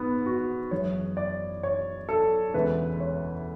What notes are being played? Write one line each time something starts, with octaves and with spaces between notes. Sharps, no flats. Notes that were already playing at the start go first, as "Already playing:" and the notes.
Already playing: G#2 B3
F#4
F#1 F#2 E3 G#3 C#5
D5
C#5
A4
E1 D2 C#3 E3 G#3 B4
C#5